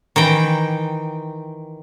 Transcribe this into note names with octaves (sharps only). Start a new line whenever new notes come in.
D#3 E3 G5